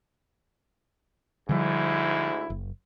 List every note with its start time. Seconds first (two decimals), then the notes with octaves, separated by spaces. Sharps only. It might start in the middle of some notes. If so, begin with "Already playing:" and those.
1.49 D2 G#2 D3 F3 G3 E4
2.50 F#1